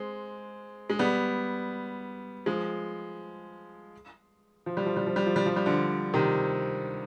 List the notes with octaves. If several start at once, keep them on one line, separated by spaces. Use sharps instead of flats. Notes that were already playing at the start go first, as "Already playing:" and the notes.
Already playing: G#3 C4
G#3
G3 B3
F3 G#3
F3
G3
F3
G3
F3
G3
F3
G3
F3
G3
D3 F3
C3 D#3